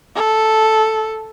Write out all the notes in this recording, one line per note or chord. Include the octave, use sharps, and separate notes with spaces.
A4